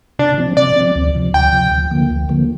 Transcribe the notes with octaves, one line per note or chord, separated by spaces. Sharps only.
C3 D4
F3 C4
C3 D5
F3 C4
D2
C3 F3
D2 G5
C3 F3
D2
D3 F3 A#3
D2
D3 F3 A#3